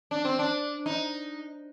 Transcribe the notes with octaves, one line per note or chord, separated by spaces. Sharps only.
D4
C4
D4
D#4